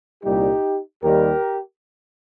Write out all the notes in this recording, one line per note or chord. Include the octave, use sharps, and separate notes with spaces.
C2 A#2 G3 D#4 G4
D#2 D#3 G3 G4 A#4